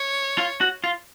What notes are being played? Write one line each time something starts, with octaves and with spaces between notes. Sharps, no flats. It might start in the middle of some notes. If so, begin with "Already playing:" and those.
Already playing: C#5
F4
F#4
F4